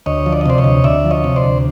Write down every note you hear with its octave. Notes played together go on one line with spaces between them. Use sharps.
D2 C#5 D#5
F3
D5
D#5
C3 C5 D5
C#5 D#5
D2
D2 D5 E5
F3
C#5 D#5
C3
C5 D5
D2